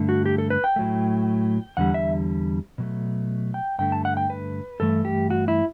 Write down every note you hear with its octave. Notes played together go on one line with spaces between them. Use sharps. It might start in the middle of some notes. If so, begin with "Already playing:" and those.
Already playing: G2 D3 A3
F#4
G4
A4
B4
G5
A2 F#3 A3
E2 D3 G3 F#5
E5
B2 F#3 A3
G5
G2 D3 A3 G5
A5
F#5
G5
B4
G2 E3 A3 A4
G4
F#4
E4